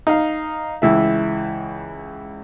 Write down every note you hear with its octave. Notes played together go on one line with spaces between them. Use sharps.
D#4 F5
C#2 E3 E5